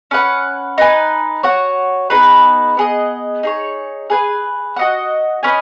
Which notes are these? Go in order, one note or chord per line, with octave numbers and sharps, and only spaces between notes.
C#4 B4 F#5
D#4 B4 G#5
F#4 C#5 F#5
B3 D#4 G#4 B4
B3 G#4 D#5
D#4 G#4 C#5
G#4 B4 G#5
F#4 D#5 F#5
C#4 B4 D#5 G#5